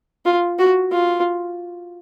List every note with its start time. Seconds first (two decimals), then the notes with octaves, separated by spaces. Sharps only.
0.25 F4
0.59 F#4
0.91 F4